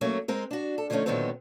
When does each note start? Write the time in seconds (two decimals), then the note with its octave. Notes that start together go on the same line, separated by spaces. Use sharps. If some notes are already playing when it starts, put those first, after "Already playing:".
0.01 F#3 A3 A#3 C#4
0.28 G#3 C4 A#4
0.51 D4 F#4
0.78 A4
0.90 D3 F3 G3 A3 C#4 D#4
1.06 A#2 D3 D#3 F#3 B3 C4